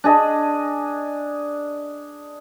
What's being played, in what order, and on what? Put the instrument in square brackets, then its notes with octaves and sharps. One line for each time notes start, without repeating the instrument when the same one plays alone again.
[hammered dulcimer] D4 G#4 D#5